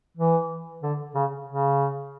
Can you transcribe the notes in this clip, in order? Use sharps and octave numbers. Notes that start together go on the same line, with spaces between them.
E3
D3
C#3
C#3